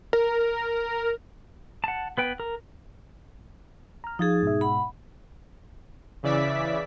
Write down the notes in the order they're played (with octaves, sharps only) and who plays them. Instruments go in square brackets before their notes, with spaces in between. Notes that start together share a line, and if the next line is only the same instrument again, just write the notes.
[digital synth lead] A#4
[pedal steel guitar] F#5 A5
B3 B4 G5
A#4
[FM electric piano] A#5 F6
[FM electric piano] F3 F5 A6 [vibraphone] D#4 G#4
[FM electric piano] G#2 B2 E5
[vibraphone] F#5 B5
[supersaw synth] C#3 E3 D5 E5 B6